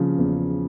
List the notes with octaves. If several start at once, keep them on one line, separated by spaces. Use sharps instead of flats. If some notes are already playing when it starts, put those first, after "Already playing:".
Already playing: C#3 F3
E2